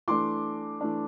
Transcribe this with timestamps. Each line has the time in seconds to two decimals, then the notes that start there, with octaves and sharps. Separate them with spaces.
0.08 E3 A3 D4 C6 D6
0.81 E3 A3 D4